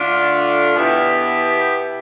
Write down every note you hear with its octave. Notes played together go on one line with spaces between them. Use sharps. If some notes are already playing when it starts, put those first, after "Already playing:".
Already playing: D3 A3 D4 F4
B2 B3 E4 G4